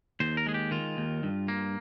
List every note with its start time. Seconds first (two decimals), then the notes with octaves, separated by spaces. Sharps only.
0.20 D#2 C5
0.37 A#4
0.46 G#3 G#4
0.54 G4
0.71 D#3 F4
0.97 D#2
1.23 G2
1.48 A#3